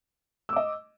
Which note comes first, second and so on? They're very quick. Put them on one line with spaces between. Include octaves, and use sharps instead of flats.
E6 D6 D#5